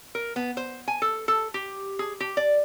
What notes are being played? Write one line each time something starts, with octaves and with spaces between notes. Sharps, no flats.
A#4
B3
C5
G#5
A4
A4
G4
G#4
G4
D5